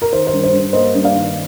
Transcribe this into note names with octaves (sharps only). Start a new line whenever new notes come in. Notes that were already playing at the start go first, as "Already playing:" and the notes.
A#4
D#3 C5
C5
G2
C5
G2
A#3 C5 D#5
G2
D5 F5
D#3